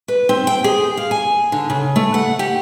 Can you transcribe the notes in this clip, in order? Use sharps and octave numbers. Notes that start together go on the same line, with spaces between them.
B4
C4
G5
G#4
F5
G#5
D3
C#3
A3
F#5
G4